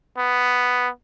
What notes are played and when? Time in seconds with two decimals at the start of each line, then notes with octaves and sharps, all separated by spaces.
0.18 B3